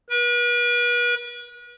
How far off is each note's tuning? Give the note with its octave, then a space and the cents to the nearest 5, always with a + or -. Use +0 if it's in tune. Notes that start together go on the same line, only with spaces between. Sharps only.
B4 -40